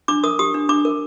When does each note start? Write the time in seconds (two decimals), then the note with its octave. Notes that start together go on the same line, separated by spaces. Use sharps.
0.08 D4 D6
0.24 A#4 D#6
0.39 G4 D#6
0.54 D4
0.69 D4 D6
0.85 A#4